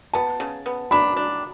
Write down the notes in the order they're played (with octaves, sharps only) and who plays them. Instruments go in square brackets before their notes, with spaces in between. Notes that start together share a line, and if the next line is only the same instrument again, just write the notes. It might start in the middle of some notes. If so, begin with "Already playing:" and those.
[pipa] B3 [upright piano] A5
[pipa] C#3
B3
[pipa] D4 [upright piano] B5
[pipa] D4